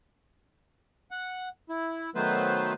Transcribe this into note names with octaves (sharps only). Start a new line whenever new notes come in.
F#5
E4
D#3 F#3 A3 B3 B4 C5